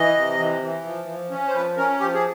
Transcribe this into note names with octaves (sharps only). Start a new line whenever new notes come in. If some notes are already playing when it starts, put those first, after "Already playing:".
Already playing: E3 D#5
C3
E3
E3
F3
F3
C#4
C5
F3 B4
C#4 A#4
F3 G4
G#4